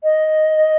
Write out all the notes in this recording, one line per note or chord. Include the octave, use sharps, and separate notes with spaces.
D#5